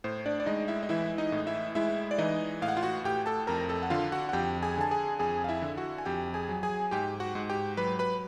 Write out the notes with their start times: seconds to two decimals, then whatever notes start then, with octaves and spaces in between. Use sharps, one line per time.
0.04 A2 C5
0.26 D4 D5
0.40 D5
0.46 G#3 D#4 D#5
0.68 E4 E5
0.83 D#5
0.89 E3 E4 E5
1.18 D#4 D#5
1.32 A2
1.46 E4 E5
1.75 G#3 E4 E5
2.11 D5
2.18 E3 D#4 D#5
2.62 A2 F5
2.68 F#5
2.77 F4 F5
2.83 F#4 F#5
3.04 A2 G4 G5
3.26 A4 A5
3.47 F2 A#4 A#5
3.69 A4 A5
3.83 F#5
3.90 D3 F4 F5
4.12 F#4 F#5
4.29 F#5
4.33 F2 G4 G5
4.63 G#4 G#5
4.77 D3 A5
4.91 G#4 G#5
5.19 F2 G#4 G#5
5.44 F5
5.49 E4 E5
5.62 D3
5.77 F#4 F#5
5.98 G#5
6.05 F2 G4 G5
6.34 G#4 G#5
6.49 F#3
6.63 G#4 G#5
6.91 G#2 G4 G5
7.20 F#4 F#5
7.35 G#2
7.50 G4 G5
7.77 F#3 B4 B5
7.99 B4 B5